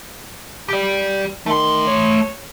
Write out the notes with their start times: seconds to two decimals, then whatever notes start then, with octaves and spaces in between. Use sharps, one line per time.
0.68 G4 D5
1.46 D#3 A3 C6
1.87 C#5